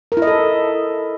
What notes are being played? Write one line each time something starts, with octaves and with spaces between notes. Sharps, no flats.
A#4
E4
D#5
A4